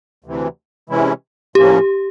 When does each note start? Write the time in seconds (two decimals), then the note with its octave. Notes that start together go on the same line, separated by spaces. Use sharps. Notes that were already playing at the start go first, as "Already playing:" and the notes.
0.24 D2 C3 E3
0.89 C3 E3 G#3 C#4 E4
1.55 A2 F3 A#3 C#4 G4